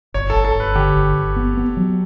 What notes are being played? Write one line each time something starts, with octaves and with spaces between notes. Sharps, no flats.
G1 C#5
A4
G1
A4
G1
B4
D3 G4
G1
G1
B3
B3
F#3